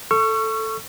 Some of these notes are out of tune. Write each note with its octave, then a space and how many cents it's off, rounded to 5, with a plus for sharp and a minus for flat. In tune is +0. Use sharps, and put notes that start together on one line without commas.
A4 +0 C#6 +0 E6 +45